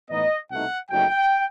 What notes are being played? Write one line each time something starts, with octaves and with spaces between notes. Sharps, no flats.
A2 E3 B3 D#4 D#5
C2 B2 A3 D#4 F#5
F#1 F#2 F#3 A3 D#4 G5